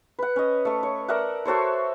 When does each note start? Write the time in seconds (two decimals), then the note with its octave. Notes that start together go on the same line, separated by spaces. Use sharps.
0.19 B4 F#5
0.36 C#4 D#5
0.65 A3 C#5
0.83 C#5
1.08 A#4 D5 E5 F#5
1.45 F#4 A4 C5 C#5